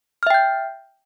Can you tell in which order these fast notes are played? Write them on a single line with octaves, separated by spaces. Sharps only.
F6 E5 G5 G6